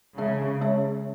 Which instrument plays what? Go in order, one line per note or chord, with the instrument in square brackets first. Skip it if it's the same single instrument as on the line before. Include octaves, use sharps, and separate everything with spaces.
[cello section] C#3 [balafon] G#3 C#4 G#4 C#5 E5
[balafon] G#3 C#4 G#4 C#5 E5